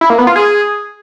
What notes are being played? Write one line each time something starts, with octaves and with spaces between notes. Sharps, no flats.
E4
A#3
B3
F4
G#4